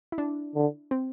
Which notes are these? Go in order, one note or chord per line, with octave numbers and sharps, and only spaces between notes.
E4
D4
D3
C4